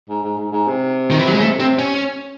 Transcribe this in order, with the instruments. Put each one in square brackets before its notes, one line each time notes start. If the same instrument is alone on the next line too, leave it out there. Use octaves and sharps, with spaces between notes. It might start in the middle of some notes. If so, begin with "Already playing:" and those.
[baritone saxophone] G#2
G#2
G#2
G#2
C3
[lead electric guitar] D#3
E3
F#3
G#3
[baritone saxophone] C#3
[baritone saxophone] C3 [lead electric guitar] A3
[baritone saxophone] C3 [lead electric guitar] C4
[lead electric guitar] C#4